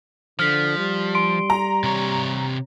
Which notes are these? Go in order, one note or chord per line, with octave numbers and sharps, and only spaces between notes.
D3 F3 F6 B6
G3
C6 D7
A#5
C3 C#5